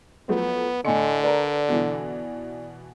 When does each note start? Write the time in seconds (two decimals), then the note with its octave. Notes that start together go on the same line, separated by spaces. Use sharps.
0.29 F3 F#3 A3 B3
0.85 A2 D3 D#5 G#5 C6 C#7
1.23 A#4 B4 D5
1.68 B2 E3